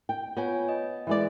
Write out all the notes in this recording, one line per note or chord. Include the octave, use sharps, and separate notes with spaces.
G5
B3 F4 C#5 G#5
D#5
E3 G#3 D5